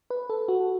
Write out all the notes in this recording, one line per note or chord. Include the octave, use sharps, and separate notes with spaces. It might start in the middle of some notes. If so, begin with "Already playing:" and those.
B4
A4
F#4